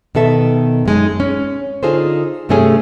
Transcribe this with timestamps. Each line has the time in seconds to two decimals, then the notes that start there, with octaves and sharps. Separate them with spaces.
0.15 B2 D#3 A4 E5
0.85 F#2 G#3 D#4
1.20 C#4
1.83 D3 D#4 F4 G#4 A4 C5
2.49 G2 C3 G3 A3 C#4 G#4